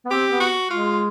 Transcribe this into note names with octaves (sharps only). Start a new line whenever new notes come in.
B3
C4 G4
B3
F#4
G#3 F4